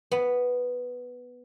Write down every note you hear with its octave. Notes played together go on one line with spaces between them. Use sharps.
B3